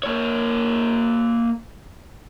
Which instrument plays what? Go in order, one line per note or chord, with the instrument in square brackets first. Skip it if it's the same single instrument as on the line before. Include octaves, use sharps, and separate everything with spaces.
[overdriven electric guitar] A#3 C#5